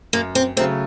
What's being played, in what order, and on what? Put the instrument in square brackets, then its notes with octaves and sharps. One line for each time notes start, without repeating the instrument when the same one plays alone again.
[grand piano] F#2 [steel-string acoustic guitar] A#3
[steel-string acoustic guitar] C4
[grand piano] C#3 F#3 A3 [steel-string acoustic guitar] C4